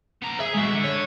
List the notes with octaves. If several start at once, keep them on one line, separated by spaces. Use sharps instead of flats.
B3 A#5
G#4 E5
G#3 F#4
D3
C#5